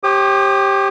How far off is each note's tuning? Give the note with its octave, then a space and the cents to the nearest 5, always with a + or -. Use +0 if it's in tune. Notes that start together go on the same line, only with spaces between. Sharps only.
G4 +0 C#5 -45 D#6 -40